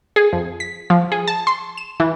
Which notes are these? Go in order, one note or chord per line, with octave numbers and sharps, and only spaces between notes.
G#4
F2
B6
F3
G#4
A5
C6
E7
E3